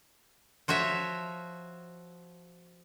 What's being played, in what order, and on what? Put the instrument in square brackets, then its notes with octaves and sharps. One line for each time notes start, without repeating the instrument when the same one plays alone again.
[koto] F3 F#4 C#5 E5